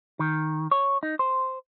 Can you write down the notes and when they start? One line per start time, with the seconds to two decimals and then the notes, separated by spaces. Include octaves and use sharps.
0.19 D#3
0.71 C#5
1.03 D#4
1.19 C5